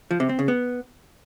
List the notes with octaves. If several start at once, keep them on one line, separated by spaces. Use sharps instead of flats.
F3
C3
C4
C#3
B3